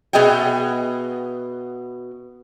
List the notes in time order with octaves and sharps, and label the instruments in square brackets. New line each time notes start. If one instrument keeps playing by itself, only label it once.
[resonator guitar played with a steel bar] B2 B3 G#4 D#5 E5 G5